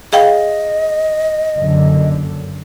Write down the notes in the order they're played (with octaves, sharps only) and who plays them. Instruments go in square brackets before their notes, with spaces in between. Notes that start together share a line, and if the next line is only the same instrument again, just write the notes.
[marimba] G#4 F5 G5 [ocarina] D#5
[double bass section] F#1 F#2 D3